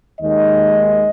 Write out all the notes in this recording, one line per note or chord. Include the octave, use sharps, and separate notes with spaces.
D#2 D#3 G#3 D#5